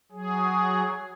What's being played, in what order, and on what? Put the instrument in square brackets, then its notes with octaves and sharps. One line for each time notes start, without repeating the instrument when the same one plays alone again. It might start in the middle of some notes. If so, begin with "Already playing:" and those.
[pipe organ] F#3 G#4